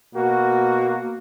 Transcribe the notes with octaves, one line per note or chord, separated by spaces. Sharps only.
B2 A#3 F#4